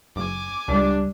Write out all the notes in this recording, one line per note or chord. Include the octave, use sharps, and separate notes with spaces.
F#1 G#5 D6
C#2 G3 D4